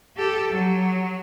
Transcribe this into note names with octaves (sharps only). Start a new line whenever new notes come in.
G4 A4
F#3